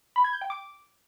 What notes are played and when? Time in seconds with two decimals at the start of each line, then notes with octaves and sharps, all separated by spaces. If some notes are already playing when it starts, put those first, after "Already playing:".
0.16 B5
0.24 G#6
0.33 G6
0.41 G5
0.50 D6